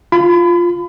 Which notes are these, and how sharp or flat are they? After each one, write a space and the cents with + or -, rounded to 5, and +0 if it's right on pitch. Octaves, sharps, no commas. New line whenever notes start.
F4 +0 B5 +35